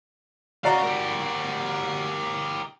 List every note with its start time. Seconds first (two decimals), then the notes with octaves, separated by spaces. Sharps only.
0.64 F#4 C#5 D5 F5 A#5
0.84 G4 A#4